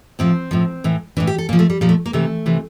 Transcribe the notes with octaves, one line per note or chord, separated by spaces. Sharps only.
A2 F3 C4
A2 F3
A2 E3
A2 E3 D4
G4
A4
A#2 F3 A#3
A3
G3
A#2 F3 G3
A3
A#3
C3 E3 A3
C3 E3